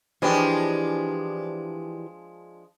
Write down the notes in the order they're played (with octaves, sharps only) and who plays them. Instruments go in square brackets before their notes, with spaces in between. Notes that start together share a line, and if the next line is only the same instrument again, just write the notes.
[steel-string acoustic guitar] E3 G4 D5 [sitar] F3 G#3 D4